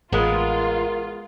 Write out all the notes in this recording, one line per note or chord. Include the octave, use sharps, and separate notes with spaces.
A1 G#3 B3 F4 A#4